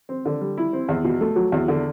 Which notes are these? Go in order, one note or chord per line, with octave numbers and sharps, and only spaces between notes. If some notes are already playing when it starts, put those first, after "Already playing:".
C4
D3
G3
E4
C4
E2
B2
A3
F#3
E2
D3